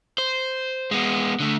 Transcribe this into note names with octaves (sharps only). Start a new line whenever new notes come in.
C5
G#3 B3
D3 A3